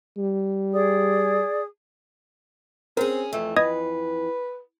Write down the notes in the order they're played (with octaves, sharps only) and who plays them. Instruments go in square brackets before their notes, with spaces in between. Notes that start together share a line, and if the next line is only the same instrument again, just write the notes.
[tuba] G3
[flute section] G#4 D5 D#6
[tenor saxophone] C4 [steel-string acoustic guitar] C#4 G#4 [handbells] A#4
[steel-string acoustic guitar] F2 E3 [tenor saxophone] A3
[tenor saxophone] B4 [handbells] D#5 D#6 G#6